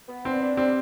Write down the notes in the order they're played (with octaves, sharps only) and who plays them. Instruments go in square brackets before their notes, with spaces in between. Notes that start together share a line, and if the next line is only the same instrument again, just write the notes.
[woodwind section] B3
[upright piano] C4 [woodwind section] D4
[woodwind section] D4
[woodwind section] G3 [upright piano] C4